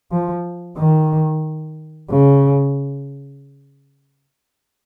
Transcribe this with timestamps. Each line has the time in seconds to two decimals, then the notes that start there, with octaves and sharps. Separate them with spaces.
0.11 F3
0.78 D#3
2.10 C#3